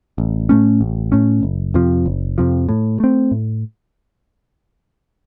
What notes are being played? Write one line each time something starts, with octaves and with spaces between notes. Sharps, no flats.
A1
A2 A3 C#4
A1
A2 A3 C#4
F#1
F2 C3 F3
F#1
F2 C3 F3
A2
A3 C4
A2